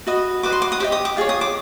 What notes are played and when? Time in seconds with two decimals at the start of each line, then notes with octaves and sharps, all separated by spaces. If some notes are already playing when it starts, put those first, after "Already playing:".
0.07 F#4 B4 D#5 D#6
0.43 F#4 B4 D#5 D6
0.52 C6
0.62 D6
0.72 D#6
0.80 G4 C5 D#5 D6
0.92 D#6
1.05 D6
1.17 F4 G#4 C#5
1.29 D#6
1.41 D6